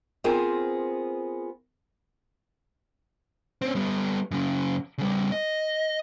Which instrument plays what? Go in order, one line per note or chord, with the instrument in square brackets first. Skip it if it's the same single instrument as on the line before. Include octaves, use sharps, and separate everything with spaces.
[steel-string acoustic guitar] B3 C4 F4 G#4 A#4 C5
[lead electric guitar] C4 C#4
G3 B3
F#2 C#3
C#3 G3
D#5